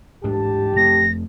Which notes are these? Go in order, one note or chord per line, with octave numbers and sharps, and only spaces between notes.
A1 D2 G#2 D4 G4 A5
F2 A3 C4 A#6